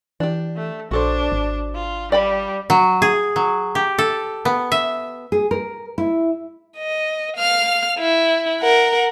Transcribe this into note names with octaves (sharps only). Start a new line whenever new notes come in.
E3 D4 G4
A3
A#1 D4 F#4 A4 C5
G#1
F4
G3 D5 G5 B5
F#3
G#4
F#3
G4
A4
B3
E5
G#4
A#4
E4
D#5
F5 F6
E4
A#4 F#5